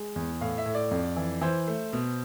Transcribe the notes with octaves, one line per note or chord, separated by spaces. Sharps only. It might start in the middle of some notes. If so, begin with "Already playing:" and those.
Already playing: G#3
E2
A2 F5
E5
A2
D5
F2
E3
E3 C5
A3
B2